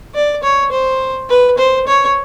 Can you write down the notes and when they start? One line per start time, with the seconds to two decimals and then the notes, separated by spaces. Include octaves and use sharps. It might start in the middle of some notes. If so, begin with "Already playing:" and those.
0.15 D5
0.43 C#5
0.71 C5
1.29 B4
1.58 C5
1.87 C#5